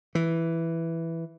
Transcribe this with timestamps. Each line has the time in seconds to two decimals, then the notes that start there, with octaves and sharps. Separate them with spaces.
0.15 E3